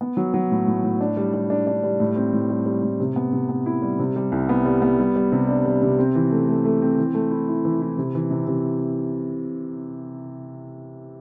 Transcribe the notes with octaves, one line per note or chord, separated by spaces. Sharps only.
B3
F#3
F#3
A2
A2
A2
D4
G3
G3
D4
D4
G3
A2
C4
A2
G3
G3
A2
C3
B3
C3
B3
E4
G3
C3
G3
C2
B3
G3
B3
G3
G3
C3
D4
G3
C3
C4
E3
A3
A3
A3
C4
E3
A3
E4
E4
E3
E4
C3
E3
C3
C3